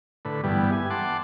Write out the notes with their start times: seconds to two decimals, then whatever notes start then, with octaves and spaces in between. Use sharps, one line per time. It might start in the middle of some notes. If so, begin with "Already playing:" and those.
0.25 A2 D3 B4
0.44 G2 E3 G3 B3
0.72 G#5
0.90 F#5 A5 C6 D6